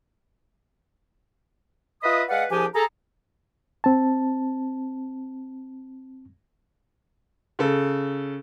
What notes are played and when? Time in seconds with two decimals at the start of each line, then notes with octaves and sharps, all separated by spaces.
2.02 F4 B4 D#5 E5 B5 D#6
2.29 G#3 B4 D5 F5 F#5
2.50 C2 F3 D4 G4 G#4 G#5
2.74 G#4 A4 A#5
3.84 C4 A5
7.59 C#3 A4